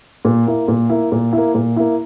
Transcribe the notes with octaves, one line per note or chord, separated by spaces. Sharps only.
A#2
A#3 E4
A#2
A#3 E4
A#2
A#3 E4
A#2
A#3 E4